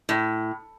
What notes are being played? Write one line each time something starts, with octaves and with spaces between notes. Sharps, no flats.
A2